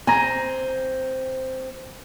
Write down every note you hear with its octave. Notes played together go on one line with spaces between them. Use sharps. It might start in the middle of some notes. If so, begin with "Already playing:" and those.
C4 G#5 A#5